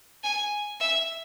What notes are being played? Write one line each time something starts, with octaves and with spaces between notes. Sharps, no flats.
G#5
E5